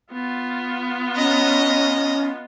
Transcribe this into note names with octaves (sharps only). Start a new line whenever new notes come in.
B3 F4
C#4 D#5 A#5